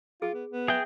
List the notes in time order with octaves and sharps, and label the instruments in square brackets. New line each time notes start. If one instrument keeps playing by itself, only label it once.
[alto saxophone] F4 [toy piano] G#4
[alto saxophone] B3
B3
[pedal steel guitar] G#4 G5 [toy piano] E5